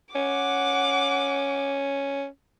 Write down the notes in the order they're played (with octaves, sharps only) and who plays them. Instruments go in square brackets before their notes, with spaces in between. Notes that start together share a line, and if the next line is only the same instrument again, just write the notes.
[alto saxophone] C#4 [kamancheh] F#5 D6